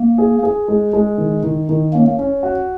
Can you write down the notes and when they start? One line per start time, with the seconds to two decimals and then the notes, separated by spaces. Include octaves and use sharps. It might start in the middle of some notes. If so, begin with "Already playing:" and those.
Already playing: A#3
0.18 G#4
0.43 G#4
0.68 G#3
0.93 G#3
1.18 D#3
1.43 D#3
1.69 D#3
1.93 A#3 C#4
2.19 C#4
2.43 F#4